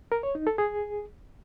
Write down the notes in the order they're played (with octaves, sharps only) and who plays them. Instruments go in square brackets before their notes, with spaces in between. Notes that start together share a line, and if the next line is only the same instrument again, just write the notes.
[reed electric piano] A#4
C#5
D#4
A4
G#4